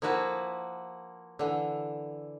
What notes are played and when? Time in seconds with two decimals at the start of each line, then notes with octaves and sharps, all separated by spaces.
0.02 F3 A#3 E4 F#4 B4 A5
1.39 D3 E3